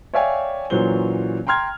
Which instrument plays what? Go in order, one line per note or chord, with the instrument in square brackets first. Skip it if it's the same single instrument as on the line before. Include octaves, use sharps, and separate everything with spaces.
[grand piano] C#5 D5 E5 F5 G5 G#5
A#2 E3 F#3 C#4 C5 G7
G5 A#5 C6 F6 G#6